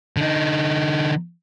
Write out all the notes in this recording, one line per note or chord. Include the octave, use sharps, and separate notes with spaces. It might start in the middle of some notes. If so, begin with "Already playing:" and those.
D3 D#4